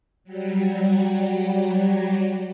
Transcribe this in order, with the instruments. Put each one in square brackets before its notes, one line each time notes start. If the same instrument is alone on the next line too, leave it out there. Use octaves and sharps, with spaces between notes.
[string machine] F#3 G3